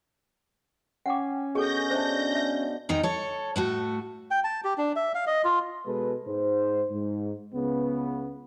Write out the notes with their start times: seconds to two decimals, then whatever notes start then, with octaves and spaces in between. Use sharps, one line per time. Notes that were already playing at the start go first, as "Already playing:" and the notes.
1.06 C#4 F#5 G5 D6
1.55 B2 G#4 A4 C#5 G#5 G6 A#6
1.91 D4 C5 E5 A5
2.35 E5
2.89 E2 D#3 D#4 A#4
3.03 A4 C#5
3.56 A2 A3 F#4
4.31 G5
4.44 A5
4.64 G4
4.78 D4
4.96 E5
5.15 F5
5.27 D#5
5.44 F4
5.86 B2 G#3 A4 B4
6.27 G#2 C5
6.91 G#2
7.55 C#2 C#3 B3